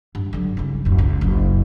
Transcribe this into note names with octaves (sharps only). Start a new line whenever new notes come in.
G2
D3 F#3
C2 C#3
D1 F#2
C#2
F#1 B1